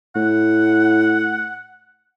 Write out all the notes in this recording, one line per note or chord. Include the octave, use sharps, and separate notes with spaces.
A2 F#5